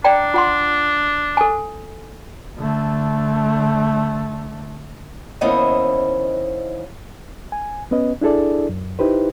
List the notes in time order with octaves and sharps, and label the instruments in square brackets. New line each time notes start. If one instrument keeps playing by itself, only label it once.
[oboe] D4 [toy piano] D5 G5 A#5
[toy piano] F4 F#5 C6
A4 G#5
[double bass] D3 A3
[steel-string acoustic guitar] D#2 B3 C#4 E4 C5 D#5
[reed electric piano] G#5
B3 C#4 B4 D#5
D4 E4 G#4 A4 D5
F#2
D#4 E4 G4 B4 C5